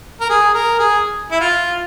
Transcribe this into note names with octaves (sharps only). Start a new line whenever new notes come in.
A#4
G#4
A#4
G#4
E4
F4